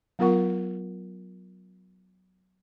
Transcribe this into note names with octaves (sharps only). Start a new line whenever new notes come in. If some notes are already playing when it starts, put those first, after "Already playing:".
F#3 B3 F4 A#4 F#5 C#6